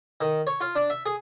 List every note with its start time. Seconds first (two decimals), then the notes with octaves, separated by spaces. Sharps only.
0.21 D#3
0.47 C#5
0.61 F4
0.75 D4
0.90 E5
1.06 G#4